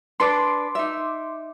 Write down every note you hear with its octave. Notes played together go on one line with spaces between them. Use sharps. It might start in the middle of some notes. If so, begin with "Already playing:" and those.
D4 A4 B4 C6 D6
D#4 E5